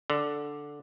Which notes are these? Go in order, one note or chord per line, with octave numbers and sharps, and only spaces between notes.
D3